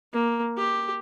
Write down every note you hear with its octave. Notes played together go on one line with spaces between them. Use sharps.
A#3
G4